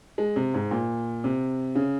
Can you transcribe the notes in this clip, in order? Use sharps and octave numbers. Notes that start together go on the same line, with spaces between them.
G#3
C3
G#2
A#2
C3
C#3